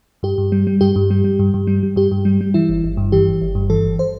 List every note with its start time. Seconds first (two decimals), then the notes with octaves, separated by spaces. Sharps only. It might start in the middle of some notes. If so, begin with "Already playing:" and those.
0.23 G2 G4
0.38 G2
0.52 G3
0.67 G3
0.81 G2 G4
0.96 G2
1.10 G3
1.24 G3
1.39 G2
1.54 G2
1.67 G3
1.83 G3
1.96 G2 G4
2.11 G2
2.25 G3
2.41 G3
2.54 E3 E4
2.69 G1
2.84 G1
2.97 G2
3.12 E3 G4
3.26 G1
3.42 G1
3.55 G2
3.70 E3 A4
3.84 G1
3.99 C5